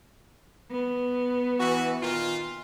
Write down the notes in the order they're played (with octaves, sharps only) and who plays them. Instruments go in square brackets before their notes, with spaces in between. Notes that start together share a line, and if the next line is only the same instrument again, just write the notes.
[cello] B3
[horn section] E3 F#4
A#2 D#3 F4